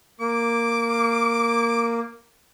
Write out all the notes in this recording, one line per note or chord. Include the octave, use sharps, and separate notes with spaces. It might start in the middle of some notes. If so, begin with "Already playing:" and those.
A#3 D6